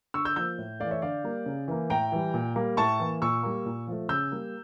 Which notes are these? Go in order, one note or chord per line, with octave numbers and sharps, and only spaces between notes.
D3 C#6 E6
E6 G6
F3 A#3 E6 G6
A2
E3 A3 D5 F5
C#5 E5
D3 D5 F5
G3 A#3
C#3
E3 A#3
A2 G5 A#5
E3 G3
A#2
G3 A#3
A2 A5 C#6
E3 A#3
A#2 C#6 E6
G3 A#3
A#2
F3 A3
C#3 E6 G6
G3 A#3